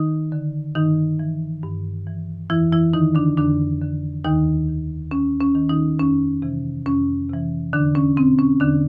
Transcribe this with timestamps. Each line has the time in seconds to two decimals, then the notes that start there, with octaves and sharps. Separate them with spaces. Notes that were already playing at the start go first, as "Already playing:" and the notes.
Already playing: D#3 D#4
0.32 D3
0.75 G2 D#3 D#4
1.19 E3
1.63 G2
2.07 E3
2.50 F2 E3 E4
2.72 E3 E4
2.93 D3 D#3 D#4
3.15 D3 D4
3.37 F2 D3 D4
3.82 D3
4.25 D#2 D#3 D#4
4.68 D#3
5.11 D#2 C#4
5.40 C#4
5.55 D#3
5.69 D#3 D#4
5.99 F2 C#4
6.42 C3 E3
6.86 F2 C#4
7.30 C3 E3
7.73 E2 D3 D4
7.95 C#4
8.17 B2 C4
8.39 C#4
8.60 E2 D3 D4